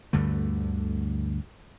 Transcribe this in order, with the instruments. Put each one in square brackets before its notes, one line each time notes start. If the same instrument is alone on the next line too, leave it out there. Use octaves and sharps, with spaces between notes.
[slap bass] D2 G2 D3 A3